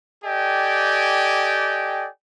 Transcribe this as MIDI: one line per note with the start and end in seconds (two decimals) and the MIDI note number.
0.25 2.08 67
0.25 2.08 69
0.25 2.08 74
0.25 2.08 75
0.25 2.08 79
0.25 2.08 80